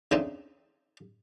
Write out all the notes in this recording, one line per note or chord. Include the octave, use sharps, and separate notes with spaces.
C#3 A3 C4 D4 D#4